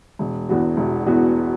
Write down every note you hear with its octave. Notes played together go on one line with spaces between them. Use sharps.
E1
E2 E3 B3 F#4
E1
E2 E3 B3 F#4